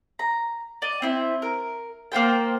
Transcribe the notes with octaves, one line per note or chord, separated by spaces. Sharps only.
A#5
D5 D#5
C4 E4
A#4
A#3 F4 C5 G5